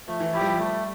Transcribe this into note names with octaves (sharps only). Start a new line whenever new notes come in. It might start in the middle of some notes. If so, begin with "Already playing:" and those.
F3 A3
E3
F3 E4 G4
G3
F3
G3 A3